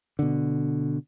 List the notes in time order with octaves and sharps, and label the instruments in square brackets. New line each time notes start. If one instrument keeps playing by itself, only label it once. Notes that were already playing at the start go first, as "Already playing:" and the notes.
[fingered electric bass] B2 D3